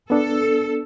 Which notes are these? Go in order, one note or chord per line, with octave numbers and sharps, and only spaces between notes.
B3 D4 A4